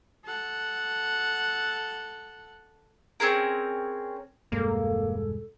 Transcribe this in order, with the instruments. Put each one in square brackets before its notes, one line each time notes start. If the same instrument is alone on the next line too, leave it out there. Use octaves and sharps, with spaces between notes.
[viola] A4 F#5
[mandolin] C4 C#4 G#4 A#4
[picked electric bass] E1 G2 G#3 [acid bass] A#3 [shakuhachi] A4